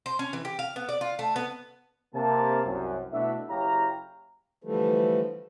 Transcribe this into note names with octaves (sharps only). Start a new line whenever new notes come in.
C5
C#4
E3
G4
F5
B3
D5
F4
A3
B3
C3 A#3 A5
C2 F#2
B2 A3 D4 E4 F#4 E5
F#1 E4 G4 C#5 F5 A#5
D3 E3 F3 G3 A3